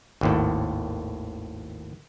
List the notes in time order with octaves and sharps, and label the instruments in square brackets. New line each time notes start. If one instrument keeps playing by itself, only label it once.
[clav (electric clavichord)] G#1 D#2 A2